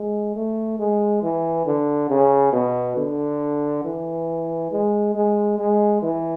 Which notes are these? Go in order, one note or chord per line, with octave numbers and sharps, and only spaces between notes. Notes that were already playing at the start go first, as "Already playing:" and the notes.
Already playing: G#3
A3
G#3
E3
D3
C#3
B2
D3
E3
G#3
G#3
G#3
E3